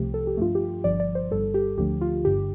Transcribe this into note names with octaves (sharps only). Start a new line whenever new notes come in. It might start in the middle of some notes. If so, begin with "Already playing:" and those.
Already playing: C2 C3 F3 A3 G4
A4
G4
G2 F3 A3 F4
G4
G1 G2 F3 D5
D5
C5
G1 G2 G3 A4
G4
D2 D3 F3 A3 G4
F4
G1 G2 D3 G4